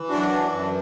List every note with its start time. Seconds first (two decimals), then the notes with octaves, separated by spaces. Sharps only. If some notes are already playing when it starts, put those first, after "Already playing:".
Already playing: E3
0.10 F#2 D4 F#4
0.31 E3
0.52 F#2